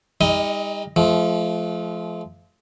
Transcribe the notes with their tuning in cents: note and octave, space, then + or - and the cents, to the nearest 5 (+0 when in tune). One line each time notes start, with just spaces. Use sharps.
G3 +45 D#4 +30 D#5 +0
F3 -15 A3 -40